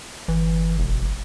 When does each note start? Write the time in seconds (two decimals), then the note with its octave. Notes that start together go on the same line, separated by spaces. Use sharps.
0.28 G1 E3
0.79 E1